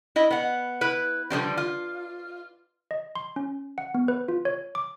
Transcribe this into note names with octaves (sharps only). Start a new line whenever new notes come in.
E4 D#5
B3 F#5
E4 B4
D3 F3 G3 C4
F4
D#5
C6
C#4
F#5
B3
B4
F4
C#5
D6